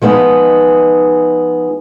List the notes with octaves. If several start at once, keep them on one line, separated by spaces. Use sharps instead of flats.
F3 G#3 B3 D#4 G#4